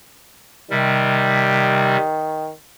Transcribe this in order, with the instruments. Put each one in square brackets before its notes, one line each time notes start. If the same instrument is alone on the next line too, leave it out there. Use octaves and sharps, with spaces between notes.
[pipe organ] C3 G3 [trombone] D#3